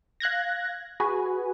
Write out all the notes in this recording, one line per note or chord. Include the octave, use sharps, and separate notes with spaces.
F5 F#6 G#6 A#6
F#4 G#4 B4 G#5